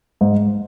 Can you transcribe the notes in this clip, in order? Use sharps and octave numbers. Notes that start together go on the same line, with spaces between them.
G#2